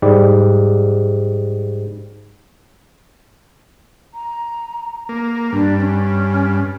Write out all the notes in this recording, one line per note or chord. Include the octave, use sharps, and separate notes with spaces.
G#2 G3 D5
A#5
A#3
G2 D4
C#4